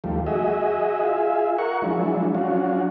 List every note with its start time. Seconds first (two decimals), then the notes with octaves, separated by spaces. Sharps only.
0.04 D#2 F3 G3 A3
0.26 F#4 G#4 D#5 E5
1.04 F4 G#4 E5
1.58 A#4 F#5 C#6
1.82 F3 F#3 G#3 D4 E4
2.35 F#3 C#4 D4 F4 F#4